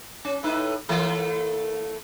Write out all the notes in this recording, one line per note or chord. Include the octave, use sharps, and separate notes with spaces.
C#4
A2 D#4 B4
E3 A3 A#3